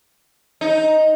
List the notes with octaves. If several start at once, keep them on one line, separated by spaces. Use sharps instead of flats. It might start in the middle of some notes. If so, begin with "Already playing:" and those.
D#4